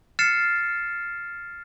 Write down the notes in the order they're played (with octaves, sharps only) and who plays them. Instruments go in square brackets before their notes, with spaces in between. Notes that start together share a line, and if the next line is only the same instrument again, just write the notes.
[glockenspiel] F6 A6 C7 C#7 E7